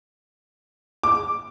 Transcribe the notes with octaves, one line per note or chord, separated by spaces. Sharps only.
D6